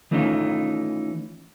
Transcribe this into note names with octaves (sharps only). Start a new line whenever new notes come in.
D#3 E3 A3 C#4 D#4 F4